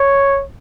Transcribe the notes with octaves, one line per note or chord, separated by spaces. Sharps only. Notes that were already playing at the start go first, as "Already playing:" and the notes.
Already playing: C#5